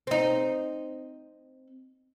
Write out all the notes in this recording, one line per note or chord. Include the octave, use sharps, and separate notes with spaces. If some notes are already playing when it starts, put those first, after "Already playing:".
C4 D#4